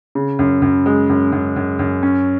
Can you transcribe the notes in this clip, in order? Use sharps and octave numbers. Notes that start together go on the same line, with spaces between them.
C#3
F#2
F#2
G#3
F#2
F#2
F#2
F#2
C#4